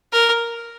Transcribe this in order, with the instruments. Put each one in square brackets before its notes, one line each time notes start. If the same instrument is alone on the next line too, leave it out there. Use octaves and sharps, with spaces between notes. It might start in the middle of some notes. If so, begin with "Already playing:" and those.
[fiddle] A#4